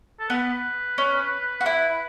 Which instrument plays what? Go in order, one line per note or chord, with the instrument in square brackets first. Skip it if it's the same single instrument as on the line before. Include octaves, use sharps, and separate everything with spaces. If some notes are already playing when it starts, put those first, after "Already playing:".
[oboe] A4
[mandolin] B3 [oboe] B4
[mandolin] C#4
F#4
E4